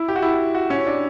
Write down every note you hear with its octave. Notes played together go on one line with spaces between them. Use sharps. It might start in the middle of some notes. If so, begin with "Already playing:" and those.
Already playing: E4
G4
F#4
E4
F#4
C#4
D4